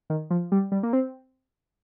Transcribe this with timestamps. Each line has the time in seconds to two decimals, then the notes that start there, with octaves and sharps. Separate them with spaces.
0.10 D#3
0.30 F3
0.52 G3
0.72 G3
0.83 A#3
0.93 C4